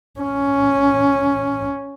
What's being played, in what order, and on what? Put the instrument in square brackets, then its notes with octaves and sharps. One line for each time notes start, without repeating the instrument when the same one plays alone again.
[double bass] C#4